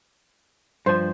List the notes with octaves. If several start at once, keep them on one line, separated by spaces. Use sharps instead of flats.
G2 F3 C5